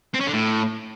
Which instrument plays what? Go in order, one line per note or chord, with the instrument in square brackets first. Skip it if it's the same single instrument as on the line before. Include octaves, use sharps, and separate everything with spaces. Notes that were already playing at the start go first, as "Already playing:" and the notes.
[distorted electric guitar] C4
C#4
D3
A2